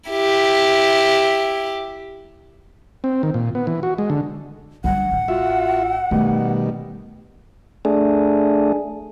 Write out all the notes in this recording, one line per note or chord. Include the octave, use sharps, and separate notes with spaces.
E4 G4
C4
D#3
A#2
B3
E3
F#4
G#3
D3
D3 G3 F#5
A1
F4 F#4 E5
B2 D#3 G3 A3
A3 D4 G#4